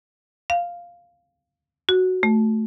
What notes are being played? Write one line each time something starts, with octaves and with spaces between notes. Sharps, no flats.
F5
F#4
A3